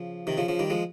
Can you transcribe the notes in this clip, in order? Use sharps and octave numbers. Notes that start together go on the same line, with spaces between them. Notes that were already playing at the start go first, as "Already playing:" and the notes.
Already playing: C#3 F3
C3 D#3
C#3 F3
C#3 F3
D#3 G3
F3 G#3